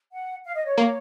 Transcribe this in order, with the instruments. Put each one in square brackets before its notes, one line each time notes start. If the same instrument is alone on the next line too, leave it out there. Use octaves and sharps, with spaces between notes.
[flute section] F#5
F5
D#5
C#5
[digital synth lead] A#3